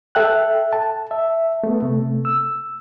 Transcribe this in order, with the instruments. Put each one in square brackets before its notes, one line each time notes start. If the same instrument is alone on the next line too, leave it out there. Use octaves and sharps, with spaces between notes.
[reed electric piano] A4 E5 G5 F#6
A5
E5
A3 B3
C3 A3
E6